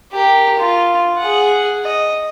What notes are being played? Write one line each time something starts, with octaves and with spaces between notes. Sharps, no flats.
G4 A#4
F4
G#4 F#5
D#5